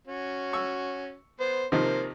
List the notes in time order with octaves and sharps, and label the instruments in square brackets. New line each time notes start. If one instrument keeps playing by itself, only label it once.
[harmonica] C#4 F#4
[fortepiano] C#6 E6
[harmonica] B3 C5
[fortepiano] C3 D#3 F3 [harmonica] A#3 C5